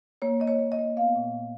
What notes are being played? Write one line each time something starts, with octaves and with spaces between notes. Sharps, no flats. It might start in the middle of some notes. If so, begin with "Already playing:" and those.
A#3 C#5
A#3 D#5
C#5
A#3
D#5
A#3
B3 F5
A#2
A#2